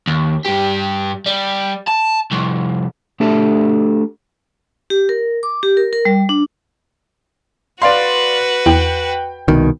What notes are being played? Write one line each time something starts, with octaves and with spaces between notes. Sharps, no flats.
D#2
G2 G4
G3
A5
C2 F2
A3 D4 G4 A4 E5 A5
G4
A#4
D6
G4
A#4
A#4
G3
D4
F#4 B4 D5 F5 C6
E2 G5
C2 B2 D#3